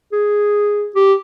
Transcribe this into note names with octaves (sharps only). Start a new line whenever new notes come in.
G#4
G4